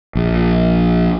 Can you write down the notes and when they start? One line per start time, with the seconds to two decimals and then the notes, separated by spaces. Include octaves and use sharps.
0.15 A#1